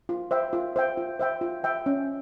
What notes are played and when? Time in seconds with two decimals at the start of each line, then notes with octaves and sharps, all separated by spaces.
0.09 F4
0.31 C5 E5 G5
0.53 F4
0.76 C5 E5 G5
0.97 F4
1.19 C5 E5 G5
1.41 F4
1.63 C5 E5 G5
1.86 C#4